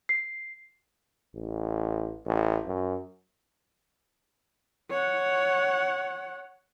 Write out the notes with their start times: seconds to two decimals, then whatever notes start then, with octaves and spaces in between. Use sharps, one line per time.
0.09 C7
1.35 A1
2.26 A1
2.67 F#2
4.90 C#5 F#5